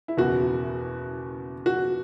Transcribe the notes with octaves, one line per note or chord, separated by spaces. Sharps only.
E4
F#1 E2 B2 F#4
F#4